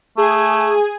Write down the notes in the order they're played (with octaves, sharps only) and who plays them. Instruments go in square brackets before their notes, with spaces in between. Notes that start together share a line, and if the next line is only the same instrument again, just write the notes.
[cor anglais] A3 [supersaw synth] G#4 G#5